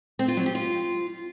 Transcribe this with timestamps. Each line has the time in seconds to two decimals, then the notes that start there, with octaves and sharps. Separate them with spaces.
0.19 C4
0.28 F4
0.37 F#3
0.46 G4
0.55 F4